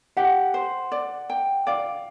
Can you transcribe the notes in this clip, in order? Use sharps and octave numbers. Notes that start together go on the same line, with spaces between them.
G4 F#5
C5
D5
G5
D5 F5